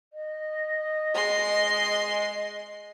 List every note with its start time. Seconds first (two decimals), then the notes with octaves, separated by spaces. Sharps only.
0.13 D#5
1.14 G#3 C6